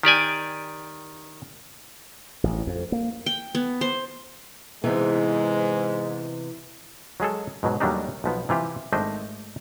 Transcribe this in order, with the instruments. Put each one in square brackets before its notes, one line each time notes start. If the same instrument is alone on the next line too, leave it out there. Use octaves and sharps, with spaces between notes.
[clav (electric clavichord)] D#3 G4 D5 G#5
[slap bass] A1
F2
A#3
[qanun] G5
B3
C5
[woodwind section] G#2 [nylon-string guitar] C3 E3 B3 [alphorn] G#3
[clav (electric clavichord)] F#3 G#3 G#4 A4
G#2 B2 F#3
D#2 F#3 G3 A3 D4 D#4
B1 F3 B3
C3 E3 F4 G4
G#1 A3 D4 C5 D#5 G5